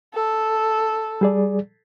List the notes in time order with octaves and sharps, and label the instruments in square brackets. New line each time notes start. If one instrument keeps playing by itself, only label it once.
[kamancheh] A4
[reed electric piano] G3 G#4 D5